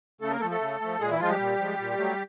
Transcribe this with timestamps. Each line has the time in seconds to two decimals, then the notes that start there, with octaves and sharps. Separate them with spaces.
0.21 C#3 A3 A4
0.31 A#3 A#4
0.40 A3 A4
0.43 F3
0.51 A3 A4
0.61 C#3
0.80 F3 A3
1.00 A#2 G#3 G#4
1.10 E3 E4
1.20 F3 G#3 F4
1.29 G3 G4
1.39 A#2
1.59 F3 G#3
1.79 A#2
1.98 F#3 A3